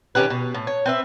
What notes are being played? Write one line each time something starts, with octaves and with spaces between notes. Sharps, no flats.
D#3 C#4 G4 B4
B2
A2
C#5
C4 B4 E5